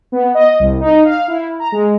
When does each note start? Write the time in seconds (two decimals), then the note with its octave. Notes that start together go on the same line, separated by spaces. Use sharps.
0.12 B3
0.34 D#5
0.60 C2
0.80 D#4
1.05 F5
1.28 E4
1.60 A#5
1.72 G#3